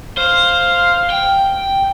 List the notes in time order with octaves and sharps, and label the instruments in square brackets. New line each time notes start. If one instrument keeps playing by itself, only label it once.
[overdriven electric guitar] C5 [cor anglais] F5
[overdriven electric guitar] G5